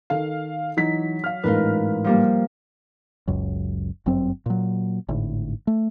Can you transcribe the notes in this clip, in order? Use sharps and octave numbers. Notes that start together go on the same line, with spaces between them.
D#3 A4 F5
E3 F#3 D#4 B6
F5 F6
A1 G#2 F4 A#4 B4
F3 G3 A#3
F#1 C#2 F#2
G1 F#2 F#3 C4
A#2 F#3
G#1 A2 D3
A3